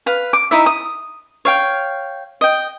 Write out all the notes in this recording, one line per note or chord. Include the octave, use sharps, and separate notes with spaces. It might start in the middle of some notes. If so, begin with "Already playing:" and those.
B4 F5
D6
D#4 E4 E5
D#6
C#5 F5 G5
D#5 G5